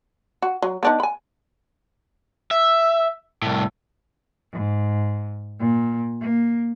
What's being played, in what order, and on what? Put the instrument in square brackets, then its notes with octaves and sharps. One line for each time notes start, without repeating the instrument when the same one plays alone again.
[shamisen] F#4
F#3
B3 D4 D#4
G#5 B5
[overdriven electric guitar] E5
C2 A2
[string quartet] G#2
A#2
A#3